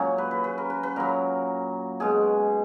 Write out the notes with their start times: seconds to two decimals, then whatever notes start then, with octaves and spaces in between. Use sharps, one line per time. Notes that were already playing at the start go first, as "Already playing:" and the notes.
Already playing: A#2 F#3 C#4
0.18 B4
0.31 B4
0.44 B4
0.58 A#4
0.70 B4
0.83 B4
0.96 A#2 F#3 A#4
2.00 B2 G#3 G#4